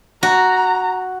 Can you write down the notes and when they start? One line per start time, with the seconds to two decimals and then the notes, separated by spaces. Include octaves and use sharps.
0.23 F#4 A#5